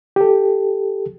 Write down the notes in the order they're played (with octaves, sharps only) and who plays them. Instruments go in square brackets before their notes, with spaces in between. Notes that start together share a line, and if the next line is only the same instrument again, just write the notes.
[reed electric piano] G4 A4